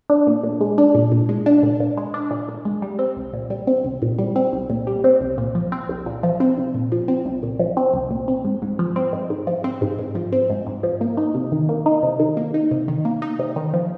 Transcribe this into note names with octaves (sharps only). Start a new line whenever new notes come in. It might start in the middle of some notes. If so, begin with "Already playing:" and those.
D4
A#2
A#2
G#3
D4
A#2
A#2
G#3
D4
A#2
A#2
G#3
D4
A#2
A#2
G#3
G3
C4
C2
A#2
G3
C4
C2
A#2
G3
C4
C2
A#2
G3
C4
C2
A#2
F3
C4
C2
A#2
F3
C4
C2
A#2
F3
C4
C2
A#2
F3
C4
C2
A#2
C4
G#2
G#2
F3
C4
G#2
G#2
F3
C4
G#2
G#2
F3
C4
G#2
G#2
F3
A#3
D#4
C3
D#3
A#3
D#4
C3
D#3
A#3
D#4
C3
D#3
A#3
D#4
C3
D#3
F3